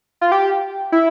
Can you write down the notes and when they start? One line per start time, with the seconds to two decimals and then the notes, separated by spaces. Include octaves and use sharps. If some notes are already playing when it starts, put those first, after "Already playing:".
0.21 F4
0.32 G4
0.92 E4